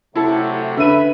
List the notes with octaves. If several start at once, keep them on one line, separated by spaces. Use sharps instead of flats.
C3 F#3 A3 E4 A4
D3 B4 E5 D#7